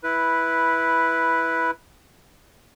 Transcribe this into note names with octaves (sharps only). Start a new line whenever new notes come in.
E4 B4